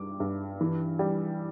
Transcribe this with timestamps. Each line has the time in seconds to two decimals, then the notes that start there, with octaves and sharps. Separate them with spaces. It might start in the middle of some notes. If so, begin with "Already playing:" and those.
Already playing: G2 G3 D6
0.20 G2
0.61 E3
0.99 G3